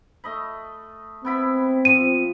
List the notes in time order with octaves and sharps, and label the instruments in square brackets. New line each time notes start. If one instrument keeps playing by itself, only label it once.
[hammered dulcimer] A3 D#5 B5
[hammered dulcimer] B3 E4 B5 [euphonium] C4
[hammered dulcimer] F3 [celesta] D#7